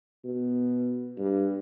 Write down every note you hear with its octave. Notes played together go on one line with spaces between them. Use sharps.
B2
G2